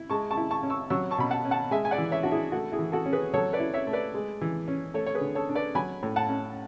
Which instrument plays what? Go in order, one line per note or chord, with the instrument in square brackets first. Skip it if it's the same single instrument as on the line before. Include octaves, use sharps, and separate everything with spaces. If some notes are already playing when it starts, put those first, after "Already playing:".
Already playing: [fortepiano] E4
G#3 A5 C#6
A5 C#6
E4
A5 C#6
C#4
C#6 E6
F#3 C#6 E6
A5 C#6
B2 B5
F#5 A5
C#4
F#5 A5
G#3 E5 G#5
G#5
D5 F#5
E3
C#5 E5
D4 F#4
E4 G#4
A3 F#4
E4 G#4
E3
F#4 A4
C#4
G#4 B4
F#3 A4 C#5
B4 D5
E4
C#5 E5
A3
B4 D5
G#3
E3
C#4
A3 A4 C#5
C#5
G#4 B4
D3
A4 C#5
D4
B4 D5
F#3 G#5 B5
A2
F#5 A5
C#4